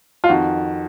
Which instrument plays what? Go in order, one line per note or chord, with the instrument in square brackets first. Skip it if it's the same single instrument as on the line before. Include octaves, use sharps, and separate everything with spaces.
[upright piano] F4
F2 D#3 F#4